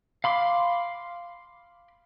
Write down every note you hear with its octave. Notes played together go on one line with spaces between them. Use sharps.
F5 B5 C6 D6